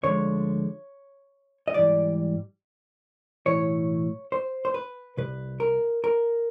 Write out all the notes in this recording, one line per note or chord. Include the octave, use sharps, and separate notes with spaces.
D2 D3 F3 G#3 C#5
D#5
G#2 E3 G3 D5
B1 A2 E3 C#5
C5
C5
B4
C2 C3 B4
A#4
A#4